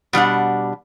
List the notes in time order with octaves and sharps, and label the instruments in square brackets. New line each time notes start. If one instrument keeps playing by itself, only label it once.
[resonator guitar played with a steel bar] B2 G3 D4 F#5